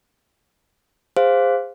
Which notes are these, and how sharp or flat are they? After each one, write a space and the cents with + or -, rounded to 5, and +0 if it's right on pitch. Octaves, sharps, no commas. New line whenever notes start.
G#4 -35 C5 +0 F5 +0